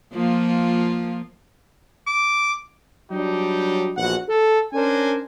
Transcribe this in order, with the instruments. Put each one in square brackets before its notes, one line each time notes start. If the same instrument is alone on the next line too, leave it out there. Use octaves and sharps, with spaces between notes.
[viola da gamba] F3 A#3 F4
[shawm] D6
[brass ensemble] F#3 G3 D4 D#4 G4
A#1 E2 F#4 F#5
A4
C#4 D4 A#4 C5 G#5